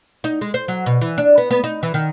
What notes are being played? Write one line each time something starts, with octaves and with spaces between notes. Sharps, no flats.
D#4
G#3
C5
F#3
B2
E3
D4
B3
B3
D#4
E3
D#3